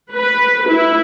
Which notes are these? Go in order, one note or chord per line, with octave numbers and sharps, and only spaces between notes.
B4
E4